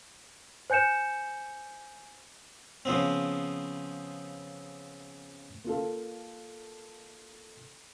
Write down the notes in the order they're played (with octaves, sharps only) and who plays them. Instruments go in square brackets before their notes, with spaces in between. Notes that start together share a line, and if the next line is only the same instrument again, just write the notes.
[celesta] C5 G#5 G6 C#7 E7
[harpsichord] C#3 F3 B3 C4
[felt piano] A#3 F4 A4